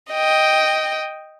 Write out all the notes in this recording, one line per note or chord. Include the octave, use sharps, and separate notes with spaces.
D#5 G5